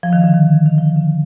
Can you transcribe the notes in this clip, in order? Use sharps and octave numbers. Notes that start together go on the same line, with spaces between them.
F3
D#3
D3
D#3
D#3
F3
D3